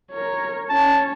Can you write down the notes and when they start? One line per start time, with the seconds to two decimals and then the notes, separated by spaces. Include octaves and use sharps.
0.11 A#4 C#5
0.70 C#4 C#5 A5